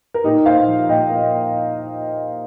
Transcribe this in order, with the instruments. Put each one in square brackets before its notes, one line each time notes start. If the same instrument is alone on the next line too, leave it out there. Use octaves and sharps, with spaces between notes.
[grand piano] A#4
A#2 D#4 G4
A#2 C5 F5
F3
A#2 D#5 G5
A#3